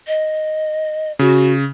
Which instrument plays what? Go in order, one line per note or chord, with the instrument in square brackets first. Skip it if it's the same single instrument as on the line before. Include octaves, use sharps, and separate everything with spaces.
[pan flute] D#5
[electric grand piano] C#3 [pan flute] F#4